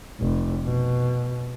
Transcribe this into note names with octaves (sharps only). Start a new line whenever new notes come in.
F1
B2